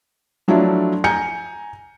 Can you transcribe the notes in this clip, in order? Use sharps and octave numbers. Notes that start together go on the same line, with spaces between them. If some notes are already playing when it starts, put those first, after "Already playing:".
F3 F#3 A3 D4 E4 F4
G#5 A#5 G6 C#7